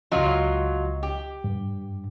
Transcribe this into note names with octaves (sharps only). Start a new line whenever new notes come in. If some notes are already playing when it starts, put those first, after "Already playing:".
C#2 F#3 F4 D#5
G4
G2